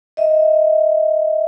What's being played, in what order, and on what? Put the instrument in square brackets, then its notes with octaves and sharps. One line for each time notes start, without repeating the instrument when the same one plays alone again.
[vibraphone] D#5 E5